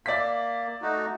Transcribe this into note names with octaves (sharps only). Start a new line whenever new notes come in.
A#3 D5 E5 B6
A3 D#4 F#4